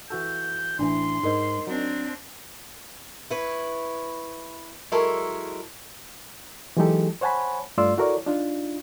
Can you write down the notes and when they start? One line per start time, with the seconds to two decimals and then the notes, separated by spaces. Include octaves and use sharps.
0.10 E3 F#4 A4 G6
0.79 A1 E3 D4 C6
1.23 G#2 D#4 A#4 C5 D#5
1.67 F#3 C4 D4
3.30 E4 B4 C#5
4.92 F#3 G#3 E4 A4 A#4 C#5
6.77 E3 F#3 G#3 D#4 G4 A4
7.21 C5 C#5 F#5 G#5 A5 B5
7.78 G2 A3 F4 D5 C6 E6
7.97 E4 F#4 A4 A#4 C#5 D5
8.26 D4 D#4 F4